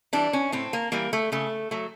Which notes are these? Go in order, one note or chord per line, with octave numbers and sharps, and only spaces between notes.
E3 G3 D4
C#4
A2 C4
A#3
E3 G3 A#3
A3
C#3 A3
F#3 A3